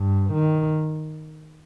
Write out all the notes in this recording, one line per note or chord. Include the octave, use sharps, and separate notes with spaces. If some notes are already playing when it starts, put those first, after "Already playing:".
Already playing: G2
D#3